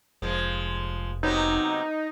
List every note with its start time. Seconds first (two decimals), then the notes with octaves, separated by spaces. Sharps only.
0.22 F1 F3 G#3
1.23 C3 F#3 B3 D#4